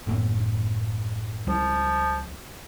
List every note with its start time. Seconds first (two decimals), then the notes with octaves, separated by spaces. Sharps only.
0.07 F#1 A2 B3
1.47 C#2 F3 G3